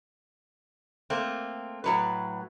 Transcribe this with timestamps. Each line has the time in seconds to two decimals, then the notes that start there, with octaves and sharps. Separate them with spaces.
1.10 A3 A#3 C4
1.84 A2 F#3 B4